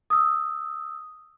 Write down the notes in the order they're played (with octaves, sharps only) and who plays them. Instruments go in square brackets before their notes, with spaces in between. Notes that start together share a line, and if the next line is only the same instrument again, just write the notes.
[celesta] D#6 E6